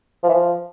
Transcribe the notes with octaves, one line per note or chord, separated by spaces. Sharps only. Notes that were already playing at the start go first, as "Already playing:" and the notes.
F3
E3
F3